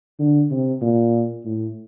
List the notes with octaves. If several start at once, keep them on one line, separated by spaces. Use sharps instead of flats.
D3
C3
A#2
A2